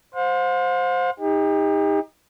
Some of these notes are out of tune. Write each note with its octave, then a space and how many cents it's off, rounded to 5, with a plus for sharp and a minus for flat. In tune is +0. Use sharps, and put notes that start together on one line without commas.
C5 +0 F5 +45
D#4 +15 G4 +40